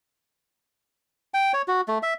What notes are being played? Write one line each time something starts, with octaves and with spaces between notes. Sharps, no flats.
G5
C#5
F#4
A3
E5